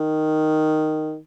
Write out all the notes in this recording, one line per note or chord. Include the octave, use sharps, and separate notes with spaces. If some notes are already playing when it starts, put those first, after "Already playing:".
Already playing: D#3